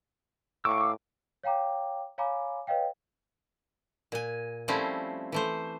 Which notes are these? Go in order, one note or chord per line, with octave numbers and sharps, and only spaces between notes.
A2 F5 C#6 D6 E6
C#5 F5 G5 A#5 D6
C#5 F5 G#5 A#5 B5 D6
B4 C#5 D#5 F5 G5
A#2 G#5
F3 G3 A3 C4 C#4 E4
E3 A3 C5